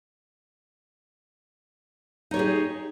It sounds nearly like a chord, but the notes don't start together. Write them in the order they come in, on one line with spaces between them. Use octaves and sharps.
D#4 C#5 G4 G#4